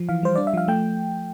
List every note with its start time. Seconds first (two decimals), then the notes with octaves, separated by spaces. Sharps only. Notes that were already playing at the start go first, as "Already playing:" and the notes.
Already playing: F3
0.09 E3 F5
0.23 G3 C5
0.36 D4 D5
0.47 E5
0.54 F3 F5
0.68 A3 G5